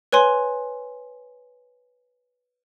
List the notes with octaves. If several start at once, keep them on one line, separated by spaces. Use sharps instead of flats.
B4 C#5 G#5 C6